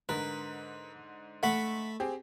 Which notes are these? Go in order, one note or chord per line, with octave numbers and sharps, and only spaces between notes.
G#2 D3 A#4 B4
A3 F#5 B5
C4 G4 G#4